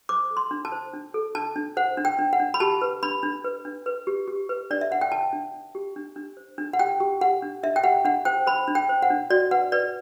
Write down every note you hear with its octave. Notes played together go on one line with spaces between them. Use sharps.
C5 D6
A4
C6
D4
A5
C5
D4
A4
D4 A5
D4
C5 F#5
D4
G5
D4
F#5
D4
B5
G4 A5
B4
D4 B5
D4
B4
D4
B4
G4
G4
B4
D4 D5
E5
D4 F#5
G5
D4 A5
D4
D4
G4
D4
D4
C5
D4
F#5
G4 G5
G4
G4 F#5
D4
D4 E5
G5
G4 F#5
D4 F#5
C5 G5
C5 B5
D4
G5
C5
F#5
D4
F#4 D5
B4 F#5
B4 D5